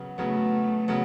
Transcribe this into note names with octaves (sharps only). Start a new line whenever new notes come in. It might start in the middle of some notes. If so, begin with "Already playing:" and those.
Already playing: C#3 F#3 B3
C#3 F#3 A3 B3
C#3 F#3 B3